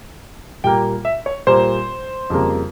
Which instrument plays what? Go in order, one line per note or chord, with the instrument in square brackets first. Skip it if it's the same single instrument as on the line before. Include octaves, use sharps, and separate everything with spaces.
[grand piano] A#2 G3 A#3 G5
E5
C#5
A#2 G3 A#3 C5
F2 C#3 G3 A#3